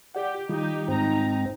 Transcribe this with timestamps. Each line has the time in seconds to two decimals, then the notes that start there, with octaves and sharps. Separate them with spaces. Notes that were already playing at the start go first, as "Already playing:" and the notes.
0.15 G4 D5 F#5
0.49 D#3 G3 D#4 F4 G4
0.88 G#2 C4 D#4 A#5